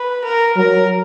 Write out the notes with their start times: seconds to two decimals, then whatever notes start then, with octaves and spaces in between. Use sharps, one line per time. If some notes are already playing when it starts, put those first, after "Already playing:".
Already playing: B4
0.25 A#4
0.57 F#3 A#4